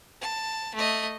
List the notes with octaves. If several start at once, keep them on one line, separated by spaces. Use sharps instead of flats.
A5
A3 D#5